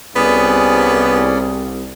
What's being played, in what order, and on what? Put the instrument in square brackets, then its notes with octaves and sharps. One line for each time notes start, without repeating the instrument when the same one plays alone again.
[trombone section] C2 [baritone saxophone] B3 [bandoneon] C#4 G#4 D5